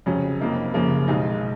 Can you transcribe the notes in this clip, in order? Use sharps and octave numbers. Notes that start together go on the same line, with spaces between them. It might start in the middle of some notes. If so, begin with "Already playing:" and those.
F2 C#3 F#3 C#4
F1 F2 F3 A#3 D#4
F#1 F#2 C#3 F3 A#3
B1 B2 G#3 D#4